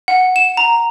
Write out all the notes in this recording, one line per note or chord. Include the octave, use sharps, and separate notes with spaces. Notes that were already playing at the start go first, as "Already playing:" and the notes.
F#5
E7
A#5